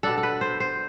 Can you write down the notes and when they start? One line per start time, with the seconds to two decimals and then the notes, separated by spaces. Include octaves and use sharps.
0.03 B2 B3 D4 A4
0.18 A4
0.23 B4
0.41 C5
0.60 C5